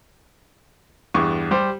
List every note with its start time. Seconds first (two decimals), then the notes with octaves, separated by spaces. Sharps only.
1.14 E2 G2 C#6
1.51 G3 G4 C5